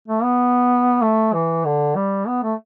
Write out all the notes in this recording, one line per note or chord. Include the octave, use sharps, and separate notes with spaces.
A3
B3
A3
E3
D3
G3
B3
A3